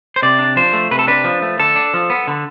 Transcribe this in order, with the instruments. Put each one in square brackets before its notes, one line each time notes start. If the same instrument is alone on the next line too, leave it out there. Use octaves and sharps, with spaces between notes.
[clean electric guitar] C5
C3 D5
D4
F3 C5
A3
C3 B4
A4
D4 B4
F3
A3
D3 A4
D4
F3
B3
D3